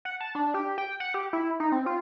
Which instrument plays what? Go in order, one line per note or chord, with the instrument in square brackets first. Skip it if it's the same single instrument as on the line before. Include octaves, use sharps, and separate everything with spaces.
[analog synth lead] F#5
A5
D4
G4
G5
F#5
G4
E4
D#4
C4
F4